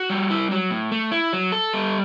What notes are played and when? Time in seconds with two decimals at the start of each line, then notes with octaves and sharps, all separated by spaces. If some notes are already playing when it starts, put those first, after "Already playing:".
Already playing: F#4
0.10 G3
0.30 E4
0.51 F#3
0.70 A2
0.92 A3
1.12 E4
1.33 F#3
1.52 A4
1.73 G3